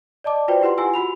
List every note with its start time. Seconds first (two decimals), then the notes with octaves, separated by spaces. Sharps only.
0.24 D5 D#5 A5 D6
0.48 F4 F#4 B4 C5 D5 G5
0.61 E4 G4 B4 F#5 C6
0.78 E4 F4 G4 G#5 E6
0.94 F#4 F#5 B5 F7